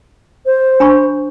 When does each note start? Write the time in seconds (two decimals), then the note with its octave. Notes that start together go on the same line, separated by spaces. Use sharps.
0.46 C5
0.80 D4 B5 C#6